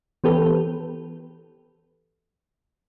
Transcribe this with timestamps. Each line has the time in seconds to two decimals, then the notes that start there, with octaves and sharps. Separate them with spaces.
0.24 E3 B3 G4 A4 B4